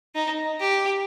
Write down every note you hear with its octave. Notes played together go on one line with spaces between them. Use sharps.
D#4
G4